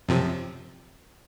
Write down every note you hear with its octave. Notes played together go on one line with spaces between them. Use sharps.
F#2 C3 F3